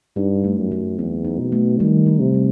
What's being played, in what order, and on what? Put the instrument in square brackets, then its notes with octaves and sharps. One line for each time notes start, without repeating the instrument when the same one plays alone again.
[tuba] G2 [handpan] D#4
[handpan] A3
[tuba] F#2
[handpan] F#3
[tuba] E2 [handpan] C4
[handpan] D#4
[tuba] B2
[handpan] A3
[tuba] D#3 [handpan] G3
[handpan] D#4
[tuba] C3
[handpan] G3